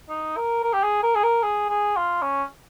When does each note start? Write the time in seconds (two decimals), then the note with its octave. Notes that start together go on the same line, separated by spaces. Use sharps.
0.09 D#4
0.37 A#4
0.63 A#4
0.73 G4
0.83 G#4
1.03 A#4
1.15 G#4
1.23 A#4
1.43 G#4
1.70 G#4
1.96 F4
2.22 C#4